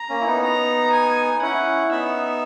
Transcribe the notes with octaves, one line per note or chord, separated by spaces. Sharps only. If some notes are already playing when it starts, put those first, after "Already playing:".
Already playing: A#5
A#3 C#4
E4
B3 D#4
A#5
G#5
C#4 E4 F#5
B3 D#4 E5